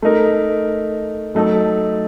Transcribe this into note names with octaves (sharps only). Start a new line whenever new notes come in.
A3 D#4 A#4
F#3 A3 D#4 A4